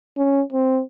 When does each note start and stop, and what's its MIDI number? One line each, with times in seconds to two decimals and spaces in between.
0.17 0.42 61
0.53 0.81 60